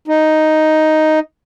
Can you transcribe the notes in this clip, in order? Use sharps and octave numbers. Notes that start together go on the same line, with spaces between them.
D#4